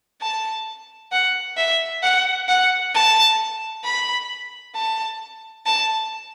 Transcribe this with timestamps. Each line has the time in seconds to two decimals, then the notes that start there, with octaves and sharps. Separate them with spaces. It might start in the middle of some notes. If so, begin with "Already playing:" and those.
0.22 A5
1.12 F#5
1.57 E5
2.03 F#5
2.48 F#5
2.94 A5
3.84 B5
4.76 A5
5.66 A5